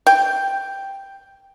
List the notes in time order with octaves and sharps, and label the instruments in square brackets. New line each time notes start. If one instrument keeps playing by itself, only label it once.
[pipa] G5